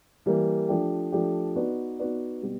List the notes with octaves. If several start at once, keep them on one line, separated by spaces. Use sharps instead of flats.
E3 G3 A#3
F3 A3 D4 G4
F3 A3 D4 G4
B3 D#4 F#4 B4 D5
B3 D#4 F#4 B4 D5
B2 G3 B3